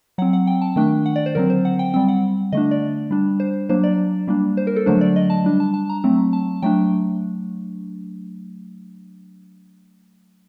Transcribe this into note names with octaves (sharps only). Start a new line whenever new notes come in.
F#3 C4 F#5
F#5
G5
A5
D#3 A3 D4 G5
F#5
D5
C5
D3 F#3 C4 A#4
C5
F#5
G5
G3 C4 G5
F#5
D3 A3 D4 D#5
D5
G3 D4
C5
F#3 A#3 D4 C5
D5
G3 A#3 D4
C5
A#4
A4
D3 F#3 A3 D4 C5
D5
D#5
A5
G3 D4
A5
A5
A#5
F#3 A3 C4
A5
F#3 A3 D4 G5